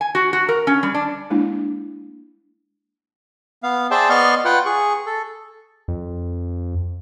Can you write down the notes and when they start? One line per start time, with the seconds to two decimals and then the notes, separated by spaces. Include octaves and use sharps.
0.01 G#5
0.15 F#4
0.33 F#4
0.49 A#4
0.67 C#4
0.83 G3
0.94 D4
1.30 G#3 A#3 D4 E4
3.63 B3 F5
3.91 G#4 C5 D5 E5 G5 A5
4.10 B3 D5 D#5 C6 C#6 F6
4.45 F4 B4 F#5 G5
4.66 G#4 C#6
5.06 A4
5.88 F2